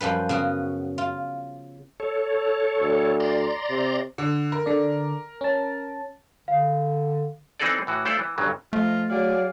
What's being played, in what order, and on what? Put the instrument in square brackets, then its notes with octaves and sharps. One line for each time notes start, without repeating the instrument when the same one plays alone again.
[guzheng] F#2 F3 G3 B4
C#3 B3 F#4
F4
[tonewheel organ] A4 C#5
[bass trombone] D2
[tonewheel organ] D5 A#5 C6
[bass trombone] C3
[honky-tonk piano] D3
A#4
[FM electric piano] D3 D4 D5
C#4 A5
[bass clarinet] D3 [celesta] F5
[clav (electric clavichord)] E3 C4 D#4 G#4 A4 D5
A2 E3 F#4
A3 E4 F4 A4 C5 D5
E3
G1 G2 C#3 F#3
[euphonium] F3 [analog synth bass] A3 [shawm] F4 [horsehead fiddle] D#5
[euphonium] F#3 [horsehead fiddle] G#4 D5 [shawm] F5